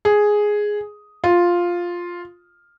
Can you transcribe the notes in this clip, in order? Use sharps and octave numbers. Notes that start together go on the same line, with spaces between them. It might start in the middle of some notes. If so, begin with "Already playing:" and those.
G#4
F4